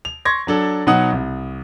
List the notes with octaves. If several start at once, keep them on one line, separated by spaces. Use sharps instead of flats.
F7
C6 C#6 G#6 A#6
F#3 D4 A4
B2 F#3 D#4 F#4 F#5 D#6
C2